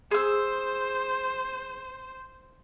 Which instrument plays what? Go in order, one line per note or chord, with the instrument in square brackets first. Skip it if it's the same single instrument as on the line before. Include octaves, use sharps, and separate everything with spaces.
[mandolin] G#4 E6 [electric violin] C5